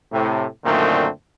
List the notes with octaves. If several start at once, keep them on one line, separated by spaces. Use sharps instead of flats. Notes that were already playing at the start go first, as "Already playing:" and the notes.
A2 C3
F#2 A#2 D3 D#3 A3 C4